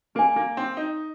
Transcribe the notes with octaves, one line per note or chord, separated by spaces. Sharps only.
A#3 A#4 G#5
A#3
C4
D#4